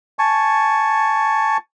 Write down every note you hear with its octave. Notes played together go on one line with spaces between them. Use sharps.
G#5 A5 C#6